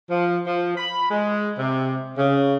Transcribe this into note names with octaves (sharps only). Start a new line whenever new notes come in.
F3
F3
B5
G#3
C3
C#3